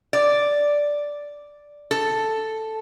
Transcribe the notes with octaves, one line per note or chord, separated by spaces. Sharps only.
D5
A4